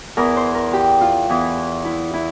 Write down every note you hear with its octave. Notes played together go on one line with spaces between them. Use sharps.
E2 E3 A#4
C5
A#4
G4
F4
E2 E3
E4
E4